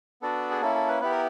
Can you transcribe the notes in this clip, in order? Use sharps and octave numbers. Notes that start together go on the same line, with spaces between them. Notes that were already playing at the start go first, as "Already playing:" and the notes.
B3 D4 F#4 A4
G#4
A#3 C#4 E4 A4
A4
B4
B3 E4 G4 B4
A#4